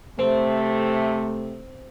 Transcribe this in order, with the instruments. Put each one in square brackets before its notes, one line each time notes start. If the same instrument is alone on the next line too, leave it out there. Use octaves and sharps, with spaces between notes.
[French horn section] C3 A3 [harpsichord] C4